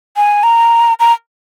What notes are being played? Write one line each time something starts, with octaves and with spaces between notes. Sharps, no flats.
G#5
A#5
A#5